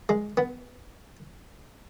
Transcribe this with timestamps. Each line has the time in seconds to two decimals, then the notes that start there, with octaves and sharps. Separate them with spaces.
0.09 G#3
0.37 B3